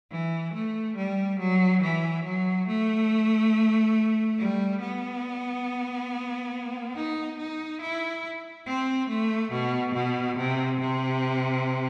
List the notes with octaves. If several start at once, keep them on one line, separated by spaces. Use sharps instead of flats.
E3
A3
G3
F#3
E3
F#3
A3
G3
B3
D#4
D#4
E4
C4
A3
B2
B2
C3
C3